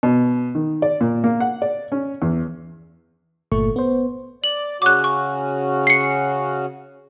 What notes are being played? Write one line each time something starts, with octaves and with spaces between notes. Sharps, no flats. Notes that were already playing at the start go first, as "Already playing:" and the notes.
B2
D#3
D5
A#2
A#3
F#5
D5
C#4
E2
G1 A#2 A3 C#6
B3 C5
D5 F#7
C#3 C#4 F#4 D6 F#6
C#6
C7 C#7